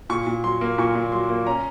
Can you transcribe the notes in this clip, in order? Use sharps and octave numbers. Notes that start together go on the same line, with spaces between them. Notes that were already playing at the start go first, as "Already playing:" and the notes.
A#2 C#6
A#2
F#3 C6
A#3
A#2 C#6
A#2
F#3 C6
A#3
C#4 A#5